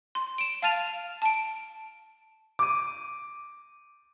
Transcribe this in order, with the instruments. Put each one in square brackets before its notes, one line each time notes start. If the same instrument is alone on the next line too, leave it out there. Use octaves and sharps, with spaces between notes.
[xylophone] C6
D7 E7
F5 A5 F6 A6 D#7 F7
A5 D7
[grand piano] D6 D#7